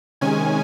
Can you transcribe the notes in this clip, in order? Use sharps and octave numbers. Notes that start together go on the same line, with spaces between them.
C3 D#3 G#3 C#4 G#5